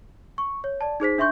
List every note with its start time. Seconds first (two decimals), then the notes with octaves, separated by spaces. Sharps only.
0.38 C#6
0.64 C#5
0.81 D5 A5
1.00 D#4 G#4 C5 B6
1.18 D4 E5 C6 C#6 G6